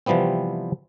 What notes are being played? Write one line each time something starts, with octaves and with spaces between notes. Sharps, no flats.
C3 E3 F3 G3 B3 C4